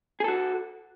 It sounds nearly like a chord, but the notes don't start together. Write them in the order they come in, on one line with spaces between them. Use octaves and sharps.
G#4 A4 F#4